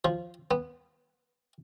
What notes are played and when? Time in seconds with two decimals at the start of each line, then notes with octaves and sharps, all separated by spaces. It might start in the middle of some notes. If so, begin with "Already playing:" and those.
0.05 F3
0.51 B3